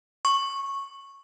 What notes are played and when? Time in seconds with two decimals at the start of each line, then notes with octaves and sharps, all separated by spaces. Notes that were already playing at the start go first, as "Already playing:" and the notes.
0.25 C#6